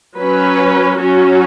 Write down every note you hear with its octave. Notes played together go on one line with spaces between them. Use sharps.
F#3 C#4 B4
F#3 C#4 F#4